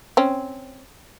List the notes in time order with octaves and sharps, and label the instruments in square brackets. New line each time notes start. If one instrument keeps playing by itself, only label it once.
[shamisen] C4 C#4